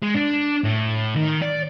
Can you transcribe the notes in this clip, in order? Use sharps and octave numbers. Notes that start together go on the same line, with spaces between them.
G#3
D4
A2
D#3
D5